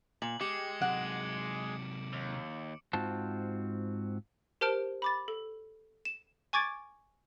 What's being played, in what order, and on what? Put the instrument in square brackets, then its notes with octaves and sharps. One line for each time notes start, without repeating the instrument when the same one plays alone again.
[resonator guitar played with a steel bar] A#2 [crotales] F#7
[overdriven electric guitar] G#3 [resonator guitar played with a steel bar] G4 [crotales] D6 C#7
[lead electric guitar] C3 F#3 [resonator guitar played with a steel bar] F#5 [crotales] D7
[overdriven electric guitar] D#2
[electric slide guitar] G#2 C4 F4 F#4 A5
[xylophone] G4 A#4 C5 A5 F6 D7
B5 D6 A6
A4
E7
G#5 C#6 D6 G#6 A6 D7